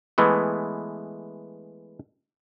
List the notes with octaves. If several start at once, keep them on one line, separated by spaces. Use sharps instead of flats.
E3 G#3 A3 B3